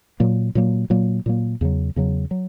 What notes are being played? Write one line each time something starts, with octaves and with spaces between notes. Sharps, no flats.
A#2 F#3 A#3
A#2 F#3 A#3
A#2 F#3 A#3
A#2 F#3 A#3
E2 C#3 F#3
E2 C#3 F#3
F#3